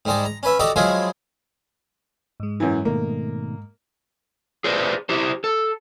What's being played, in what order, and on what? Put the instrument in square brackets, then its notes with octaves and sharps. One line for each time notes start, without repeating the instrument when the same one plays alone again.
[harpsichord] G#2 G3 G#3 A5
A#5
C#4 B4 E5
D#4 F#4 G4 A4 D5 F#5
F3 F#3 G#3 E4 F4 G#4
[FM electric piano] G#2 G#3
[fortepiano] F#2 E3
[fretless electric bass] B2 D#3 A3 [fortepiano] A#3
[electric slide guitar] G#4 B4 C5 D5
E4 G4 C5
A4